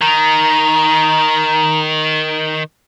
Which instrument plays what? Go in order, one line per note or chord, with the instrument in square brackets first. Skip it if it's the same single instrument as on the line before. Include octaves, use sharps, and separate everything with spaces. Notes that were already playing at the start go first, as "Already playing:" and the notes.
[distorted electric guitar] D#3 [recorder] A#5